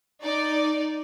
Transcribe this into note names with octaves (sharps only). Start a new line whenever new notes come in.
D#4 D5